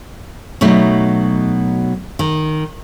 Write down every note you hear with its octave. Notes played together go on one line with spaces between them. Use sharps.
B2 F#3 A3 D#4
D#3